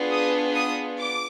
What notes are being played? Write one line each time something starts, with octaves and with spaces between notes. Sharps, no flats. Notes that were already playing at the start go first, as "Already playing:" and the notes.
Already playing: B3 D4 F4 G#4
D#6
D#6
D6